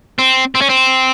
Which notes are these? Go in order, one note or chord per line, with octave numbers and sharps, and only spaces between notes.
C4
C4
C#4
C4